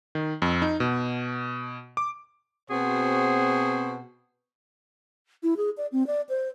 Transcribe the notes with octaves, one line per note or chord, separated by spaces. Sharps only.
D#3
F2
D#4
B2
D6
B2 C4 F#4 G#4 C5
E4
G#4
D5
C4
D5
C5